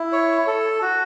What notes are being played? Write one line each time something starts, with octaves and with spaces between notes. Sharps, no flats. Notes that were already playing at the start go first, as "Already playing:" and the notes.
Already playing: E4
C#5
A4
F#4